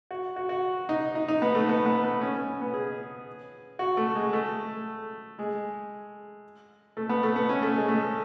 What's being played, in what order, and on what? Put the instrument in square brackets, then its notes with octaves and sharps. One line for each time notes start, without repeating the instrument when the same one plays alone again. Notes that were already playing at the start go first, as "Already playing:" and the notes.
[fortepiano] F#4
F#4
F#4
D#4
D#4
D#4
B3
A3
B3
B3
B3
C#4
C#4
B3
G#4
F#4
A3
G#3
A3
G#3
A3
B3
A3
B3
C#4
A3
G#3
A3